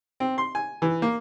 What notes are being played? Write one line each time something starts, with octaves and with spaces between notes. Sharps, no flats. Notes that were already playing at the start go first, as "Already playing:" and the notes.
C4
C6
G#5
E3
A#3